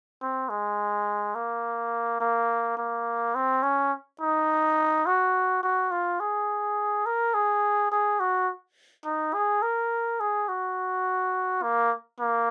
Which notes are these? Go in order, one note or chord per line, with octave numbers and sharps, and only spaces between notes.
C4
G#3
A#3
A#3
A#3
C4
C#4
D#4
F#4
F#4
F4
G#4
A#4
G#4
G#4
F#4
D#4
G#4
A#4
G#4
F#4
A#3
A#3